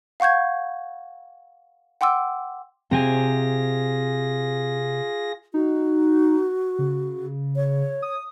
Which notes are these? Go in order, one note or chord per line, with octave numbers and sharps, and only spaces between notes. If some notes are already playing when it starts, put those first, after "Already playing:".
F5 F#5 C#6 G6 G#6
F#5 G5 C6 D6 E6
C3 C4 F4 G4 G#4 G#5 A#6
D#4 F#4
C#3
C#5
D#6